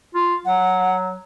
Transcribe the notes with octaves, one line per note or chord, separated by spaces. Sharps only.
F4
F#3 F#5